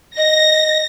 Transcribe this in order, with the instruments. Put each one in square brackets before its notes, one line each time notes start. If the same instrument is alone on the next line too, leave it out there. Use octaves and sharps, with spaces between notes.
[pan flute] D#5 [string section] A#6